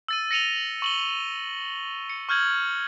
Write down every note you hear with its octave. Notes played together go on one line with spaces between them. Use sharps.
E6 A6 D#7
A#6 C#7 D#7 F7 G7
C#6 F#7 G7
C#7
C#6 F6 G6 G#6 F#7